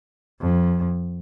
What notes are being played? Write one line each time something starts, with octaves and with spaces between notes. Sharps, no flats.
F2